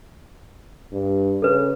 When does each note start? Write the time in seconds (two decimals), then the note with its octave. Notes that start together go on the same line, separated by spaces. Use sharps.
0.92 G2
1.42 C#3 A4 B4